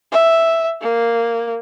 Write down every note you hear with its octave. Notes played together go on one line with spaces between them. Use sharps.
E5
A#3